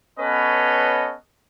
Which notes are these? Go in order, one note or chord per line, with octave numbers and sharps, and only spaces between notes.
B3 C#4 A4 B4 C#5 D#5